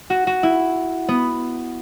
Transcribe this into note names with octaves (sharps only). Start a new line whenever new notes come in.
F#4
F#4
E4
B3